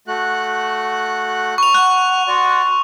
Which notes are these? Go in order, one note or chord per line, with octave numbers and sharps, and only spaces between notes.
A3 F#4 F#6
B5 C#6 F7
F#5 F#6
F#4 D5 C6